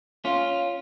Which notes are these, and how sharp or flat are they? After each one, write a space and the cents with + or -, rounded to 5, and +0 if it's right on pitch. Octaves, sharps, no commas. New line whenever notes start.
C#4 +10 F4 +0